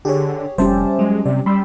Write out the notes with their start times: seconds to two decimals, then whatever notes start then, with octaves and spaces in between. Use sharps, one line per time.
0.05 D3 G4 G#4 C#5
0.58 F1 G3 C#4 G4 C5 E5 A5
0.99 F#3 G#3
1.25 C3 D5
1.46 G3 B5 C6 E6